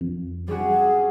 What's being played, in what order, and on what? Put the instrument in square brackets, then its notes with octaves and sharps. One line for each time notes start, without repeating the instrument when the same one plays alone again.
[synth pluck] F2
[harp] G3 C#4 F#4 [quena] G#4